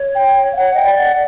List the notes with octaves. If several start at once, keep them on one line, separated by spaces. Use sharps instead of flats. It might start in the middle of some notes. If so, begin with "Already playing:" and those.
Already playing: C#5
G5
F5
C#5 F#5
D#5 G5
D5
F#5